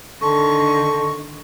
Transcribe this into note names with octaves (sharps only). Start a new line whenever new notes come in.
D3 D#3 A4 A5 C6 C#6